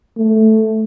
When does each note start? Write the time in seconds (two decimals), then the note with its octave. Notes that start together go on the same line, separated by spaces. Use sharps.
0.18 A3